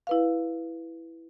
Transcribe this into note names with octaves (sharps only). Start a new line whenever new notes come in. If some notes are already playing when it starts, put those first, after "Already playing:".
E4 B4 F5